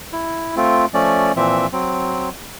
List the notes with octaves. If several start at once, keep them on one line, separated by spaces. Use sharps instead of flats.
E4
A3 C4 F4
F3 A3 C#4 D5
A#2 E3 F3 C4 E5
F#3 C4